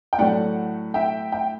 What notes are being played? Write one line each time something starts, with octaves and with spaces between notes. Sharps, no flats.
G5
A2 F#3 A3 D5 F#5
E5 G5
E5 G5